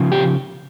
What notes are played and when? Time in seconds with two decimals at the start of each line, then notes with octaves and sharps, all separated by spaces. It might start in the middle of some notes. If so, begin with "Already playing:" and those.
Already playing: C#3 F3
0.12 G4